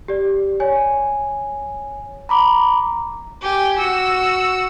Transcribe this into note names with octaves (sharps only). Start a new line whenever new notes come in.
G4 D5
C#5 G#5
A#5 B5 D6
G4 G#5
F#4 E6